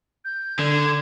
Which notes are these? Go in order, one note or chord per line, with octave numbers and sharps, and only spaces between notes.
G6
D3 G#6